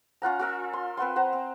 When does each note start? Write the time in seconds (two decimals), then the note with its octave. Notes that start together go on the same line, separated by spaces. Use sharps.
0.22 C#4 F4 F#5 A#5
0.39 F4 A#4 E5
0.73 C6
0.97 C4 B4 F#5 C6
1.16 C5 F#5 A#5
1.33 C4